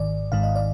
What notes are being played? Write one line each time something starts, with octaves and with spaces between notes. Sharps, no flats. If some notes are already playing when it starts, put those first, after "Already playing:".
Already playing: G#1 G#2 D#3 D5
G#1 G#2 D#3 F5
D#5
D5